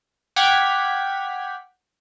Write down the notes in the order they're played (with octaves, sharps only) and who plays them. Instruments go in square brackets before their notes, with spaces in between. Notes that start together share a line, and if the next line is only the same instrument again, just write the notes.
[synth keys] F#5 G5 D6 F6 G#6 B6